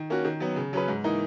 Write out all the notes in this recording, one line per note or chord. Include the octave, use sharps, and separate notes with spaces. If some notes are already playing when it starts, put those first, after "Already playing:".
Already playing: D#3
A#3 C#4 F#4
D#3
F#3 B3
C#3
F#3 C#4 G#4 B4
G#2
E3 A#3 D#4